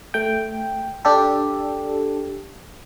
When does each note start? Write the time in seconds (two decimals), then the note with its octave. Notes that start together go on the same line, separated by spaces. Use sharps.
0.14 A3 G5
1.05 D4 G4 A4